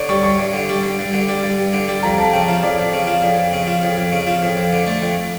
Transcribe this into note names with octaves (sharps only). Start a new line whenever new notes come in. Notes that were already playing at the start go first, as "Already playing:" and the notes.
Already playing: D3 C#5 D5
G3 C#6
G2 C#6
G2
D3
G3
G2
G2
D3
G3
G2
G2
D3
G3
F2 A#5
F2 A5
C#3 G5
F3 F5
F2 D5
F2
C#3
F3
F2 D5
F2
C#3
F3
F2
F2
C#3
F3
F2
F2
D3
A3
F2